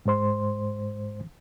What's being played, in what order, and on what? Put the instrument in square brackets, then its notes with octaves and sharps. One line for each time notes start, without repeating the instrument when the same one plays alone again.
[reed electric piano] G#2 G#3 C5 C6